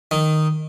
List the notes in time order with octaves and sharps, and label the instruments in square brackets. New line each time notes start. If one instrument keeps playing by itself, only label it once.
[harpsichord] D#3